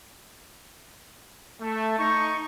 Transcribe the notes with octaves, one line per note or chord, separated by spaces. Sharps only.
A3
D#4 C#6